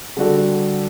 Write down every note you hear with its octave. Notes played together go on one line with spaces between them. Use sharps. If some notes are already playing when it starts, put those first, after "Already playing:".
D3 G3 D4 F#4 A4